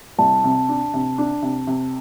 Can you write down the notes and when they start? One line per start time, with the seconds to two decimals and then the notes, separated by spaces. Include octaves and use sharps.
0.18 C2 A5
0.44 C3
0.69 D4
0.94 C3
1.18 D4
1.42 C3
1.67 C3